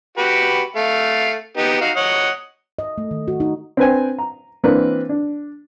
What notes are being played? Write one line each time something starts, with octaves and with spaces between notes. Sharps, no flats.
F#4 G4 B4
A3 F5
B3 D#4 G4
D#4 F#4 F5
C#5 D#5 F#5
D#5
A3
D#3
F#4
D#4
C4 D4 B4 C5 G5 G#5
A#5
E3 A#3 C4 D4 B4
D4